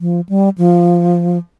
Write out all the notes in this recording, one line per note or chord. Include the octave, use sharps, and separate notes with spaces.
F3
G3
F3